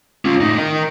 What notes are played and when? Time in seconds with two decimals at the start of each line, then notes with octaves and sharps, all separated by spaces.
0.25 C#4 F4
0.40 A2 D#4
0.58 A#4 D#5